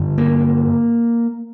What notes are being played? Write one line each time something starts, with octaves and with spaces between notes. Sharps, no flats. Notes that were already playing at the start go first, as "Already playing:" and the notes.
Already playing: G2 D3
A#3